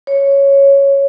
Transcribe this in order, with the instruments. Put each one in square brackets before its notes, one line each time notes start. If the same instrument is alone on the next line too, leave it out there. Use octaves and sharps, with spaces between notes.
[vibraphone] C#5